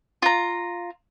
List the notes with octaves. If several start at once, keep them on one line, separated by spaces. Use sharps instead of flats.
F4 A#5